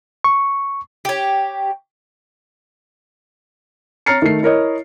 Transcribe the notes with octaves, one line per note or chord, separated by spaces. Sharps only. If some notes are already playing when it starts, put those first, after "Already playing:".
C#6
G4 C#5
C#5 A#5 F6 A6 C7 C#7
D#3 A3 C7
E4 A#4 C#5 D#5